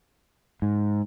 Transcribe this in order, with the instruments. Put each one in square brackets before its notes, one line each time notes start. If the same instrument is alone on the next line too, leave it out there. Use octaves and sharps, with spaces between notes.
[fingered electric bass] G#2